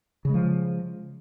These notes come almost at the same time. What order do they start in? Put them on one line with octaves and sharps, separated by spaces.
C#3 G#3 F3